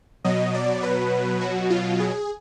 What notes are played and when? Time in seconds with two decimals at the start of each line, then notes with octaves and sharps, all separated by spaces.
0.24 B2 F#3 D#5
0.54 D5
0.83 B4
1.41 F#4
1.70 F4
2.00 G#4